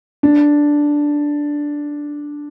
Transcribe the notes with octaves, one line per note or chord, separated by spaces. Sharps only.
D4